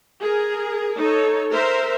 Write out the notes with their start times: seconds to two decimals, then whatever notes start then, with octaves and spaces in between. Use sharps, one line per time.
0.20 G#4 A#4
0.97 D#4 A4 C#5
1.51 A#4 C5 E5